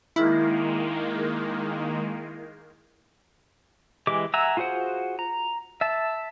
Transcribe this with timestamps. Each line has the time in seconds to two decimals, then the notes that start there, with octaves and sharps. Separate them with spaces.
0.16 D#3 G#3 A#3 E4
4.07 E3 G#3 G4 D6
4.34 E5 F#5 G#5 A#5 E6
4.57 F4 F#4 G#4 C5 F#5
5.19 A#5
5.81 E5 A5